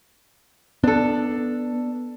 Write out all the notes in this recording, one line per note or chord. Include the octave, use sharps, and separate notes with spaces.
B3 D4 A4